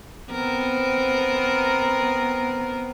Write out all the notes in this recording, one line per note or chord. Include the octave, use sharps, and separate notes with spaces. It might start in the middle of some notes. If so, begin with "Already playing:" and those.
B3 C4 A#4